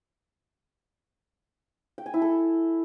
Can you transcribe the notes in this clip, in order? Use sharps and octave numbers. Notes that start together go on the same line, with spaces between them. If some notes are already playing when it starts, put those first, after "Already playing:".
G5
G#5
E4
A4